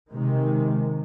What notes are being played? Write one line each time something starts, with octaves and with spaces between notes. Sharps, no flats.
C3 D#3 G#3